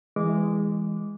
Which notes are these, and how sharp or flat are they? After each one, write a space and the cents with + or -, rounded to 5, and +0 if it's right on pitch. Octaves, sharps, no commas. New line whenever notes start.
E3 +0 G#3 -15 D6 -15